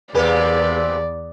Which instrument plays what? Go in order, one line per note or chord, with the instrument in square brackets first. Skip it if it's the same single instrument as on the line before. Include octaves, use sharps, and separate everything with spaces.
[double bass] E2 [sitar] C3 A#3 G4 [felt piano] G#4 B4 [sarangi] D5